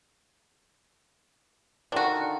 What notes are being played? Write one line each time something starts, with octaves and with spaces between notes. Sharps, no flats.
D3 D#3 D4 F4 F#4